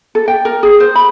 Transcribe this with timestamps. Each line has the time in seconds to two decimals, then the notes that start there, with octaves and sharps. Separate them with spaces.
0.15 A4
0.28 G5
0.45 A#4
0.63 G#4
0.80 C5
0.95 B5